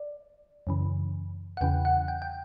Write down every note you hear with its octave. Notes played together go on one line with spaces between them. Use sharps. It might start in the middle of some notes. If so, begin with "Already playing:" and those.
Already playing: D5
F#2 C#3 E3
F#5
E2 C#3 E3 G5
F#5
G5
G5